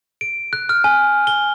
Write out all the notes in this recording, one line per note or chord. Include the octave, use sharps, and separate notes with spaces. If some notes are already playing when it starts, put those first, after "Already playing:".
D7
F#6
F6
G#5
G7